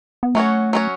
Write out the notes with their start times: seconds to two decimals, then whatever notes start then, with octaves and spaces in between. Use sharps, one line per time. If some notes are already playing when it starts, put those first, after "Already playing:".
0.23 B3
0.35 F#3 A3 C#4 F#4 C#5
0.73 F#3 C#4 F#4 C#5